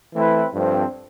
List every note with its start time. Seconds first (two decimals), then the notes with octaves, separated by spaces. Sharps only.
0.14 E3 A3 C4 E4 B4
0.54 G2 F3 A3 C4